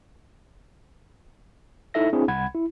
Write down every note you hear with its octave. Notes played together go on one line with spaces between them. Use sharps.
D#4 E4 A4 E5 A#6
C4 D4 E4 G#4
C2 F#5 B5 G#6
E4